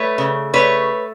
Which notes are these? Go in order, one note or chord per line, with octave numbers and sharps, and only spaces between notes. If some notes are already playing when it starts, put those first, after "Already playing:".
Already playing: A3 B4 C#5
C#3
A3 B4 C#5